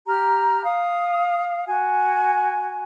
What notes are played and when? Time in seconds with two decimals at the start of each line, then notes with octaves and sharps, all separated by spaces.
0.06 G4 A#5 F6
0.63 F5 D#6
1.65 F#4 G#5